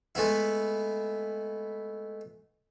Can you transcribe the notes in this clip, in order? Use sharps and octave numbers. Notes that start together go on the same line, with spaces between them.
G#3 A3 B3 E4